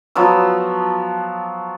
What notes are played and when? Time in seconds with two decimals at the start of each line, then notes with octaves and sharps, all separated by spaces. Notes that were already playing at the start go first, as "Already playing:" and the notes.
0.15 F3 F#3 B3 E6